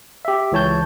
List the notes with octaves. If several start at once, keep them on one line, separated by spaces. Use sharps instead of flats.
G4 E5
C#2 E3 C#5 A5 G6